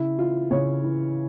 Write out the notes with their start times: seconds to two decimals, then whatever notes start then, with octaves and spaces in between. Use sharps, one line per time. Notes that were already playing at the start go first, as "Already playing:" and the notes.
Already playing: C#3 E4
0.18 E3 F4
0.50 C#3 C#5
0.84 E3